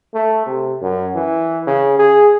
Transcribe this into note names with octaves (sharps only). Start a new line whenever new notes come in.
A3
C3
F#2
E3
C#3
G#4